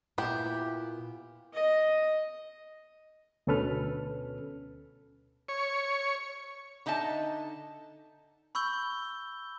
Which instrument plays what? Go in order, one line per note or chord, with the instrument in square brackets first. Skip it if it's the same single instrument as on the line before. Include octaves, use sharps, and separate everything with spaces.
[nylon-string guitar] A#2 [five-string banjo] B3 G4 [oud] E4
[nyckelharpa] D#5
[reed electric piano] D2 B2 C#4 A4 B4 F6
[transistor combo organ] C#5
[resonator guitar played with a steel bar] D3 D#4 D#5 E5 A5
[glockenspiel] B5 C#6 E6 G6 G7